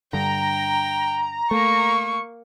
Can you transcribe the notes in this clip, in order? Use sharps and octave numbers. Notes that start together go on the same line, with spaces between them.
G2 D3 G5 A#5
A3 A#3 C#6